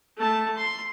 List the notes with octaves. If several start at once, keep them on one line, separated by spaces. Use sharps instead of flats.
A3 A5
C6